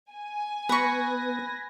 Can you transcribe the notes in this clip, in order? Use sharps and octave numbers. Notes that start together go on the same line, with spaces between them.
G#5
B3 B4 B5 C#6 G#6 A#6